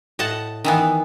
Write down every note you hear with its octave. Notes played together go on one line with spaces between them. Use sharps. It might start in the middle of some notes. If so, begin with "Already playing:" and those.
A2 D#5 F#5 A5
D#3 E3 B3